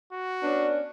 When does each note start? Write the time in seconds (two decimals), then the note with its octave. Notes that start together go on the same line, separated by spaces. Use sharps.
0.12 F#4
0.43 B3 C#4 D4